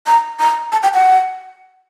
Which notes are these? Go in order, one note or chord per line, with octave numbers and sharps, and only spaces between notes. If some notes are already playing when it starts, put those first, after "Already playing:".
A#5
A#5
A5
G5
F#5